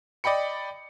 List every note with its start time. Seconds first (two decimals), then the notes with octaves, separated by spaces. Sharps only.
0.24 D5 D#5 G5 B5 C#7